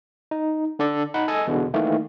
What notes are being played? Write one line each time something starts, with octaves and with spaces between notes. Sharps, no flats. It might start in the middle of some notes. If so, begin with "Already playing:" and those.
D#4
D3 D4 A4 D5
D#4 F#5 B5
A4 D#5 G#5 A5
E2 B2 D3
D#3 E3 A3 A#3